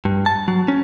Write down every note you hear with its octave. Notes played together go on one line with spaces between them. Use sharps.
G2
A5
F#3
C#4